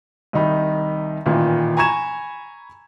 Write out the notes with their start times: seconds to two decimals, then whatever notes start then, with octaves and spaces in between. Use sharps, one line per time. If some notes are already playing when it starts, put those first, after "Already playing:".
0.33 C2 D#3 D#4 B5
1.26 A1 A#2 D#3 E3
1.77 G#5 A#5 B5 C#6 G#6 E7